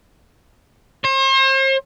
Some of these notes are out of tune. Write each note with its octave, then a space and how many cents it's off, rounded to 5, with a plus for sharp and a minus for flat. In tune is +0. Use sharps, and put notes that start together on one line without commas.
C5 +40